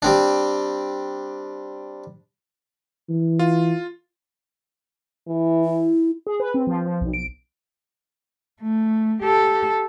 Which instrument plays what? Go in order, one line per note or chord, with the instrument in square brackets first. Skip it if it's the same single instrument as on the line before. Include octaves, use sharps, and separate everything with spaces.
[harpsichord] G3 C4 D4
[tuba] E3
[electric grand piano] F4
[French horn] E3
[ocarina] E4
[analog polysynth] G#4
B4
C4
F3
F3
B1
D7
[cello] A3
G4 A4